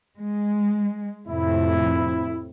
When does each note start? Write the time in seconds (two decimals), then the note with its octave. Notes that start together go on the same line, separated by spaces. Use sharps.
0.18 G#3
1.28 F2 A2 C3 E4